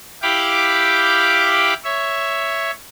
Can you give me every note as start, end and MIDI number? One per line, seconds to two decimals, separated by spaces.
0.22 1.74 64
0.22 1.74 67
0.22 1.74 77
0.22 1.74 79
0.22 1.74 83
0.22 1.74 86
1.84 2.71 73
1.84 2.71 76